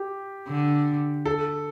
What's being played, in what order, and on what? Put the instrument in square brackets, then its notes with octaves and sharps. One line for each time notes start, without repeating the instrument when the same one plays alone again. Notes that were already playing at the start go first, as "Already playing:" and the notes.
Already playing: [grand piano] G4
[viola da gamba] D3
[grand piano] A4